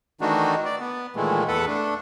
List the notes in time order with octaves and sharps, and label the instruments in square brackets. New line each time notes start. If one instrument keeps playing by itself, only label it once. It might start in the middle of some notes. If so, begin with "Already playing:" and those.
[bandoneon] D#3 E3 A3 D4 D#4 F#4
D5
B3
A#2 D#3 E3 G#3 A3
E2 A4 B4 F#5
A3 D4